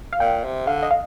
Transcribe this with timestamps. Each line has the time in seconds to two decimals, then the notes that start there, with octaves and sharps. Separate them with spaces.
0.13 F5
0.20 A#2 G5
0.44 C3
0.67 D3 F5
0.83 D#5
0.91 F5